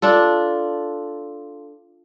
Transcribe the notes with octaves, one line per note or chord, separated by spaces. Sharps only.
D4 F4 A4